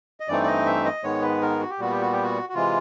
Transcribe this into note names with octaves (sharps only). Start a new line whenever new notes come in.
D#5
G2 E3 A3 C4 D#4 D5
D5
D#5
E5
D#5
G#2 D#3 G#3 B3 C#5
B4
A#4
F#4
G4
A#2 G3 B3 F#4
G4
F#4
G4
F#4
F#4
C3 E3 G#3 F4